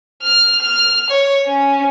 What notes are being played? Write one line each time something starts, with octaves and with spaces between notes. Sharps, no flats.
F6
F6
C#5
C#4